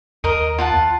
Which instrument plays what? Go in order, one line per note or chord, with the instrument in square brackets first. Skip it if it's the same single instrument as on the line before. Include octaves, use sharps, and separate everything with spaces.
[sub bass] D#2 [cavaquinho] A#4 D#5
[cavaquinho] F4 F#5 A5